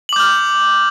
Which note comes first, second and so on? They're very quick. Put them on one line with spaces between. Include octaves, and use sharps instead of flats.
F#7 D6 G6 F6